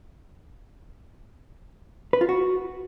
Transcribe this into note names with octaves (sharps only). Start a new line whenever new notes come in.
B4
F4
F#4